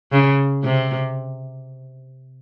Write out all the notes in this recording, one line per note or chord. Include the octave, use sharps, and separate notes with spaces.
C#3
C3